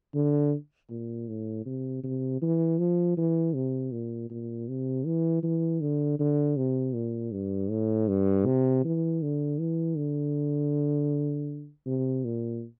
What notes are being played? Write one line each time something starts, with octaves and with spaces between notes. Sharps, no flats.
D3
A#2
A2
C3
C3
E3
F3
E3
C3
A#2
A#2
C3
E3
E3
D3
D3
C3
A#2
G2
A2
G2
C3
E3
D3
E3
D3
C3
A#2